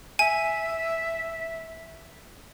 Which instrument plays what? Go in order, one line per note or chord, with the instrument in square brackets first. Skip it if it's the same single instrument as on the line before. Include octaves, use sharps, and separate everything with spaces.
[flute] E5 [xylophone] G#5